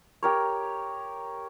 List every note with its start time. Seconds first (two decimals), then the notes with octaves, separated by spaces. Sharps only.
0.23 G4 A#4 C#5